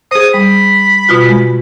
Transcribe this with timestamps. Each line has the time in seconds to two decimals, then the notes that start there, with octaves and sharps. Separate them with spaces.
0.11 G#4 C5 D#6
0.34 G3 B5
1.09 B2 F4 F#4
1.29 G#3